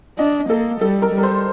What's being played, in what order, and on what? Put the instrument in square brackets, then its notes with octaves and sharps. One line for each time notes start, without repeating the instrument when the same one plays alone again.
[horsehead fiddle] D4 [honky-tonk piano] D#5
[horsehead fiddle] A#3 [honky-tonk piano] A4
[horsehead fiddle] G3 [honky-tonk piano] A4
[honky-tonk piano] A#4
[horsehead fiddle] G3 [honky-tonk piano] A#4
[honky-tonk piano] C5